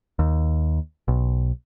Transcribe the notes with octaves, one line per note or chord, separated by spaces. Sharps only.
D#2
B1